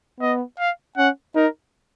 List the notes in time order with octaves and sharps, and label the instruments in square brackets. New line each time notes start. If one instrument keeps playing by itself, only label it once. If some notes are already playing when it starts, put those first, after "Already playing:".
[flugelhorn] B3 [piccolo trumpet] D#5
[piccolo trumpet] F5
[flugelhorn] C#4 [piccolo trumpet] F#5
[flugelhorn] D#4 [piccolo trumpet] A#4